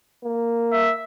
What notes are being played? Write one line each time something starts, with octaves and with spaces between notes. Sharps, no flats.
A#3
E5